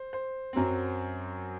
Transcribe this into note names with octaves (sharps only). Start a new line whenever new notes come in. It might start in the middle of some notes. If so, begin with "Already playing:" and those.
Already playing: C5
C5
F#2 F#3 C4